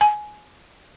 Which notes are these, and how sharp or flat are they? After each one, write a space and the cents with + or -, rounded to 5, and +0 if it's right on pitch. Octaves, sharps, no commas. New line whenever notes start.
G#5 +15